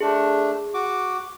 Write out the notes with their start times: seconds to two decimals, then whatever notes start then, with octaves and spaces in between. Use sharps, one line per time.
0.01 A3 D4 G#4
0.74 F#4 D6